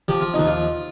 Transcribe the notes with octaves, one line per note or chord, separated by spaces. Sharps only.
F3 G4
F4
D#2 D#4
F4